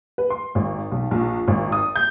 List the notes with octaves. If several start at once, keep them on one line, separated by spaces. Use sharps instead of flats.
B4
C6
G#1
B1
A#1
G#1
D#6
G6